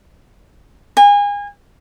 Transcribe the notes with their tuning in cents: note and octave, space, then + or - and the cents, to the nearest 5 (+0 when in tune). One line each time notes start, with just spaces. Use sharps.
G#5 -30